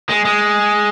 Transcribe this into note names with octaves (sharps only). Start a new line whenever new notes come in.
G#3
G#3